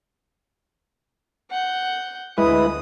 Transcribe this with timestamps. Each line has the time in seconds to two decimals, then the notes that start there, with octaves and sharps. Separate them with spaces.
1.51 F#5 G6
2.38 D2 G#3 E4 B4 D#6